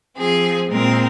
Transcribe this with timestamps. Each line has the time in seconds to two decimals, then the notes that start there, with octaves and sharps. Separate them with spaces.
0.18 F3 C4 G#4
0.71 A#2 G#3 C4 A#4